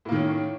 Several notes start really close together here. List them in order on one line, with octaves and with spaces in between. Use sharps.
A2 A#3 D#3 C#4